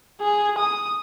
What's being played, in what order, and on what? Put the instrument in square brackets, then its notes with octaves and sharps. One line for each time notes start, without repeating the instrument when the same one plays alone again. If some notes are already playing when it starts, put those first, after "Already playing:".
[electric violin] G#4
D#6